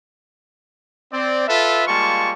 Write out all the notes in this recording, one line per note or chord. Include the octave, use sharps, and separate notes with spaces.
C4 D5
F4 A4 B4 E5
G3 G#3 A#3 F4 A5 C#6